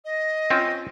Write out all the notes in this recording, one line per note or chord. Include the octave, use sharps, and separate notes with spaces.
D#5
C4 C#4 F4